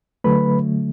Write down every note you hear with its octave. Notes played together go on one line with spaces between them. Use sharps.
D3 F#3 A3 B4 B5